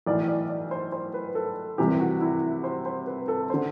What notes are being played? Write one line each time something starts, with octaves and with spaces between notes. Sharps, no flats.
B1 A2 E3 D5
D5
D5
C5
C5
B4
A4
C2 C3 E3 G4
F#4
E4
C5
C5
B4
A4
D3 C5